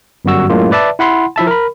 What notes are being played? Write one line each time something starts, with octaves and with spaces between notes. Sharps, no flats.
G1 F#2 G3 F#4 E6
F#2 A2 G#3 A#3 F4
B4 D5 E5 A5
E4 F#5 B5 C6
F3 E4 E5 A5
A#4 B5